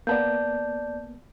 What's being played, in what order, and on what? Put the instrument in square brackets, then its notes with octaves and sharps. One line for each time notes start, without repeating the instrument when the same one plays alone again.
[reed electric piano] A#3 B3 [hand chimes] D5 A5 G6